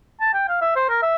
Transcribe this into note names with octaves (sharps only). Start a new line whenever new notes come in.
A5
G5
F5
E5
C5
A#4
E5